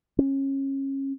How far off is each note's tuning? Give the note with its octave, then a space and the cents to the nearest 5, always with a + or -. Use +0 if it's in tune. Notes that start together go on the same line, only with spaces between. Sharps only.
C#4 -25